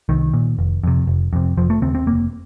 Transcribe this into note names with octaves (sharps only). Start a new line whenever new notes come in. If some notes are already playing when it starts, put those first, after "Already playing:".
C2 D#3
A#2
F1
F2 C3
F1
F2 C3
F1 F3
A3
D#2 C#3 C4
C4
F1 A#3